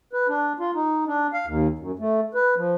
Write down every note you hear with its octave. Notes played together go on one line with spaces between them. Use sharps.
B4
D4
F4
D#4
D4
F5
D#2
F#2
A3
B4
F3